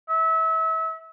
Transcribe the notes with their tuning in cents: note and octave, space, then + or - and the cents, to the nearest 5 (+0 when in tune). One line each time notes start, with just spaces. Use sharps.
E5 -30